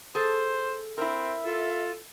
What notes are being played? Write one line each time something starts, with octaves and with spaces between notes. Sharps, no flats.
G#4 A4 C5
C4 E4 A#4 E5
F4 A4